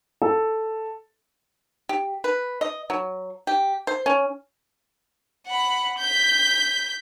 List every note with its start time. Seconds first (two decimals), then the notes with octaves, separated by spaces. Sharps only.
0.22 A4
1.89 G4
2.24 B4
2.61 D#5
2.90 F#3
3.47 G4
3.87 C5
4.06 C#4
5.47 F#5 B5
5.98 G6 B6